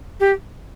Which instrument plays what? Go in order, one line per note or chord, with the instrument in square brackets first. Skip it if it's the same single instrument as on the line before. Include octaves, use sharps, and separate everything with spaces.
[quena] G4